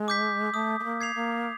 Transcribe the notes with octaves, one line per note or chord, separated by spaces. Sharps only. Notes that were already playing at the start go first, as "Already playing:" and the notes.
Already playing: G#3
D6 G6 B6
A3 D#6
A3
A#3
G#6 C7 F7
A#3